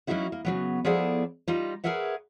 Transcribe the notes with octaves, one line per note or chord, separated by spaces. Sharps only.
F#3 A#3 C#4 D#4 E4 F#4
A#3
C#3 F#3 B3
F3 B3 E4 G#4 A4 D5
G3 D#4 F4
G#4 A#4 B4 C#5 E5 F#5